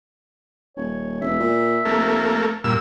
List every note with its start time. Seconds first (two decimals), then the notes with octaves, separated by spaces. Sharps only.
0.77 D#1 C#5
1.21 E1 E5
1.40 A#2
1.85 F1 A3 A#3
2.64 G2 A#2 E6